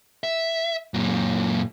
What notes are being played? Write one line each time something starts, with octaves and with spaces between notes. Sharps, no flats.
E5
F#2 A#2